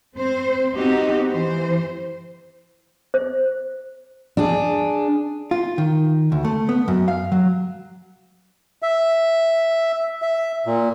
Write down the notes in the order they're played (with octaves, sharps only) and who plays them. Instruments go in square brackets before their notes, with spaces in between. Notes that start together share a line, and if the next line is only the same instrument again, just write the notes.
[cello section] C4 C5
B3 C4 D#4 F#4 G4
E3 C5
[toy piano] C5
[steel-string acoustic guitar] D4 G#4
[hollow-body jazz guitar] F4
D#3
D2
A3
B3
F#2
F5
F#3
[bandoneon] E5
E5
A#2